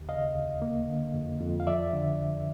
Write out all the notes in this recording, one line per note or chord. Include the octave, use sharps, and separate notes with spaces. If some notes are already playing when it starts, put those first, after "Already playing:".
Already playing: D#2
C#3 D#5 F5
D2
A#3
D3
F2
F2
F5
F3 D5 E5
D3